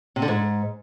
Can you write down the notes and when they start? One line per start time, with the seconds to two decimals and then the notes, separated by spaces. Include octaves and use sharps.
0.16 C3
0.22 D3
0.28 G#2